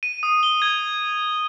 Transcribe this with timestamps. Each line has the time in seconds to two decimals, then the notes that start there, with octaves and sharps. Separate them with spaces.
0.03 D#7
0.23 D#6
0.43 G7
0.62 G#6